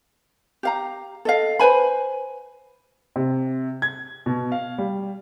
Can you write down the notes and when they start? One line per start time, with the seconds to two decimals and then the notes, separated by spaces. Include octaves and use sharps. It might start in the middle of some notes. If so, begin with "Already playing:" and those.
0.63 G4 F5 A#5
1.25 A4 D#5 F5
1.59 B4 C5 G#5 B5
3.16 C3
3.82 G#6
4.26 B2
4.52 F5
4.78 G3